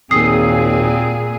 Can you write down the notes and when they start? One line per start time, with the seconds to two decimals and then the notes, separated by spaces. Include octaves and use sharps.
0.11 G#1 D#2 A#2 C4 G#4 D#6 C7